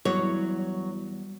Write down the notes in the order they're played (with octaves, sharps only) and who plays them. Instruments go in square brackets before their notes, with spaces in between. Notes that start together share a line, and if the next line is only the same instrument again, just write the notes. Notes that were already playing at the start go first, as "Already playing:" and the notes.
[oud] E2 [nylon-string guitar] F#3 C#5 [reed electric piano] G3